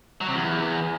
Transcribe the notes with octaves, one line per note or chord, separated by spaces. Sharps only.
F#3
C3
E2